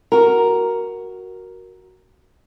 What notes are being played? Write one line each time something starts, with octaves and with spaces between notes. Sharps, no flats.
F#4 A#4